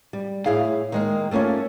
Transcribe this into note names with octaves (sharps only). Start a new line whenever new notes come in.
G3
A2 E4 G#4 F5
D#3 G#3 A#3
A3 A#3 C#4 F4 C#5